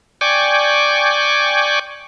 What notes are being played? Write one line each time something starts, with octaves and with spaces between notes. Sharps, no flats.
D5 G5 G#5 C#6 D6